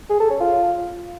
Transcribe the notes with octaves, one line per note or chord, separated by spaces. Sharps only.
G#4
A4
C#4
F4